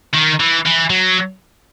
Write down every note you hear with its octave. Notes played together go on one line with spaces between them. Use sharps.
D#3
E3
E3
F#3